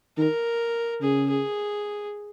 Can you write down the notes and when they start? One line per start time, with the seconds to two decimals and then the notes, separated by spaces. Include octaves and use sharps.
0.18 D#3 A#4
1.02 C#3 G#4
1.30 G#4